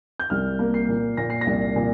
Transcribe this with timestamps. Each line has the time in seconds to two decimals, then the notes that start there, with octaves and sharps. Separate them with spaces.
0.20 G6
0.30 C2 F6
0.59 A#3
0.74 C7
0.89 A#2
1.17 A#2 A#6
1.30 C7
1.41 A#6
1.46 C2
1.76 A#2